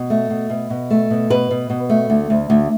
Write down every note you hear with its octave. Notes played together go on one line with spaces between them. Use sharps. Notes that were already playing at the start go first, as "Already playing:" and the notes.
Already playing: B2
A3
B2
B2
B2
A3
B2
B2 B4
B2
B2
A3
D2
D2
D2